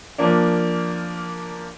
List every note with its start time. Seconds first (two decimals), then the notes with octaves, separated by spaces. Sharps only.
0.18 F3 A#3 D4